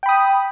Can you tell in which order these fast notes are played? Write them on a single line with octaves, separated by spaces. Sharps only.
G5 B5 D#6